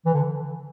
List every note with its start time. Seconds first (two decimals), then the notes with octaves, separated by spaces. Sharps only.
0.06 E3
0.14 D3